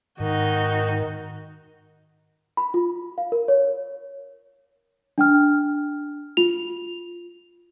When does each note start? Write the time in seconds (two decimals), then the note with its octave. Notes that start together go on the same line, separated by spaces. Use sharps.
0.20 G#2 D#3 D#4 F#4
2.57 B5
2.74 F4
3.18 F5
3.32 A#4
3.48 C#5
5.18 D4 G5 F6
6.37 F4 F7